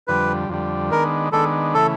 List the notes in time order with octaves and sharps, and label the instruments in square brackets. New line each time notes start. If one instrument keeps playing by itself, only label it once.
[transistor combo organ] F2 D3 G3 [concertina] B4
[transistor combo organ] F2 D3 G3
[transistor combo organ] D#3 G#3 B3 D4 [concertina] A#4
[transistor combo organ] D#3 G#3 B3 D4 [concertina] A4
[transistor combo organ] C#3 E3 A3 [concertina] A4